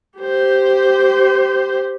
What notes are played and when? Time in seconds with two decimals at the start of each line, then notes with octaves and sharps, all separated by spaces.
0.19 G4 C5